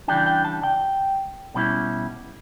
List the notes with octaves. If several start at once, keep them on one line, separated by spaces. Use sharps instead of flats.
C#3 E3 G3 D4 G5
G5
A5
G5
B2 G3 C#4 E4